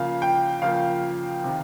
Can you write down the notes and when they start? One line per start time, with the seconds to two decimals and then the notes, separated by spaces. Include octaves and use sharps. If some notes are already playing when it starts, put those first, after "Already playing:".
Already playing: C#3 F3 A#3 F5
0.22 G5
0.62 C#3 F3 A#3 F5
1.44 C3 D#3